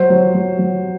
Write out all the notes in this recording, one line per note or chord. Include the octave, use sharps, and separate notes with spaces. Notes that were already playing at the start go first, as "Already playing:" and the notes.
Already playing: F#3 C5
F#3
F#3
F#3